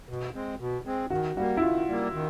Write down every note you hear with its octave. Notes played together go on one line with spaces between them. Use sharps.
B2
G#3 C4
B2
G#3 C4
D#3 F#4
G3 A#3 F#4
E4
D#3 F4
G3 A#3
D#3